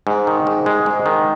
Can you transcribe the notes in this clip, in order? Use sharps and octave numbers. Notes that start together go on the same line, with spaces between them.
G#2
D#3
G#2
G#3
G#2
D#3